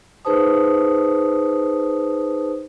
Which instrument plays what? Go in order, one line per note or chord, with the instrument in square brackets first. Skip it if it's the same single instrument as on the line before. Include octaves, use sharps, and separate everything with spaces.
[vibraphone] D#4 G#4 B4 C5 A5 D#6